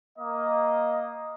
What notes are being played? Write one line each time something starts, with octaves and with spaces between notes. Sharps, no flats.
A#3 D#5